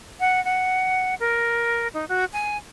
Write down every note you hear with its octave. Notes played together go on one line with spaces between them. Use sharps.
F#5
F#5
A#4
D#4
F#4
G#5